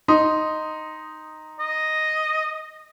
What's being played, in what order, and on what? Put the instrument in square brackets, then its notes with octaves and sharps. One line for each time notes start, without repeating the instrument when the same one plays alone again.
[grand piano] D#4 [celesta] C6 D#6
[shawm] D#5